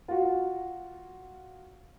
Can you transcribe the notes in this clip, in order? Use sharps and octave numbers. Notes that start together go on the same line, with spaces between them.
F4 F#4